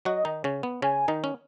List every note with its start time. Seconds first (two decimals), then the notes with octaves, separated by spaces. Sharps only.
0.05 F#3 F#4 D#5
0.25 D#3 D#4
0.44 C#3 C#4
0.63 B3
0.82 C#3 C#4 G#5
1.08 D#3 D#4
1.24 C#4